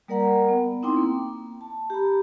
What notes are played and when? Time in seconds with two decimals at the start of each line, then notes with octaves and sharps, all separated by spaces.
0.08 G3 A#3 A#4 D5 F#5 A#5
0.48 B3
0.83 C4 D#4 E4 G5 C6 D6
0.96 A#3
1.61 A5
1.90 G4 A#5 B5